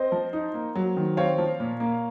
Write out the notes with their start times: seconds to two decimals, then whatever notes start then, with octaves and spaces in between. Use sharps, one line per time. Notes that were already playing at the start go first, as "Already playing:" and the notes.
Already playing: C4 C5 D#5
0.12 F3
0.33 D#4
0.54 A#3
0.75 F#3
0.97 D#3
1.17 C4 C#5 F5
1.38 F3
1.60 A#2
1.80 A#3